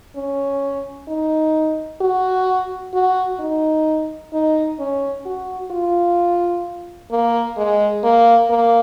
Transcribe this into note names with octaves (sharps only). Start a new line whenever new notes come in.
C#4
D#4
F#4
F#4
D#4
D#4
C#4
F#4
F4
A#3
G#3
A#3
A#3